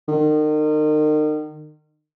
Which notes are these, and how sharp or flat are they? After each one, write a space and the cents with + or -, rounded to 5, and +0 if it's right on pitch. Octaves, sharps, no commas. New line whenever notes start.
D#3 -35